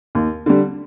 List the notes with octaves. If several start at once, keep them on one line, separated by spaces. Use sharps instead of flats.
D#2
D3 G3